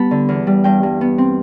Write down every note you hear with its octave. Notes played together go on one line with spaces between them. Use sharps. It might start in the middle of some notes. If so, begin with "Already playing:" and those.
Already playing: G3 B3 G4 A5 B5
D3
E2
G3
G2 G5
G2
B3
C4